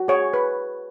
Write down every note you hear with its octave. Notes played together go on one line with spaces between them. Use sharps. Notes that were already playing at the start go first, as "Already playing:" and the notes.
Already playing: F#4
G#4 C#5
B4